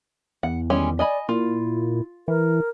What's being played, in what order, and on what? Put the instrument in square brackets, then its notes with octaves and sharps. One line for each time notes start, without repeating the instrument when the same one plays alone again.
[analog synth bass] E2 [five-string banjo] F#5
[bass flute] D#3 [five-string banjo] G3 G#3 C#4
[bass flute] D5 [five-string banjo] D#5 G#5 B5
[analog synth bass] A#2 [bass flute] E4 [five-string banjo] F4
[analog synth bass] E3 [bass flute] A#4